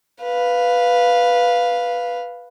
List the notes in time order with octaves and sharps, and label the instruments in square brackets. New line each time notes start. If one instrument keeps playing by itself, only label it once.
[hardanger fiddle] B4 F5